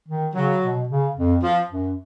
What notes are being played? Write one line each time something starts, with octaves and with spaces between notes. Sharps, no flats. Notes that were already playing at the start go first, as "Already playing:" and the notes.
D#3
C#3 F#3
B2
C#3
F2
F3
F#2